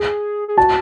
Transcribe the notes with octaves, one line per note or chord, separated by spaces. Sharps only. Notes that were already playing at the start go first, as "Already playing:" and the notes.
Already playing: G#4
G#4
F#4 A5